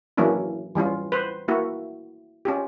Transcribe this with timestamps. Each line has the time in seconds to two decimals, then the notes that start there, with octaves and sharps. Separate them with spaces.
0.17 E3 F#3 A#3 C#4 D4 E4
0.75 E3 G3 C#4 F4
1.12 B4 C5
1.48 A#3 E4 F#4
2.45 C#4 F4 G4